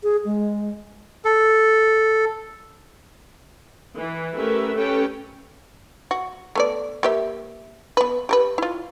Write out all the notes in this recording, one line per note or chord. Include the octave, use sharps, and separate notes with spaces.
G#4
G#3
A4
E3
A3 C#4 G4 A#4 B4 E5
C#4 G4 A4 B4 G5
F#4
A3 B3 D5
A#3 G4 E5
B3 B4
G4 A#4 B4
E4 F4